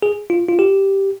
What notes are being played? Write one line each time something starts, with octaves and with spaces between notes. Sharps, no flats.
G#4
F4
F4
G4